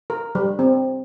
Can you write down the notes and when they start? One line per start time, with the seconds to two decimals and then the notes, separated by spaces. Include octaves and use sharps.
0.10 A#4
0.35 G3
0.59 C4